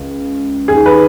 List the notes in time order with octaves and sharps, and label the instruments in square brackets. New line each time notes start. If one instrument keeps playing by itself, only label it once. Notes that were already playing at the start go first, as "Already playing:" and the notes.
Already playing: [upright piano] C#2
D#2 D#3 G#4
B4